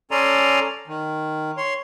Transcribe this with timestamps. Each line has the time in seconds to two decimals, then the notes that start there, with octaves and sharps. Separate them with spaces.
0.11 C#4 A4 D5 G#5 A#5 C6
0.87 D#3
1.57 C#5 C6